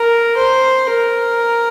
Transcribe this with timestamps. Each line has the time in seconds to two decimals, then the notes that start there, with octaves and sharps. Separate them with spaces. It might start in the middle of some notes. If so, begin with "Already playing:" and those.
Already playing: A#4
0.38 C5
0.90 A#4